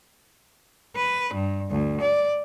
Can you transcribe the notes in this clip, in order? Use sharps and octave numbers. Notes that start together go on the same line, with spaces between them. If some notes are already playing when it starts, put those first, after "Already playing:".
B4
G2
D2
D5